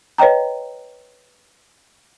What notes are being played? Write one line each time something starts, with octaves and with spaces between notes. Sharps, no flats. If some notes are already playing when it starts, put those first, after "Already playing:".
B4 C#5 D#5 G5 A#5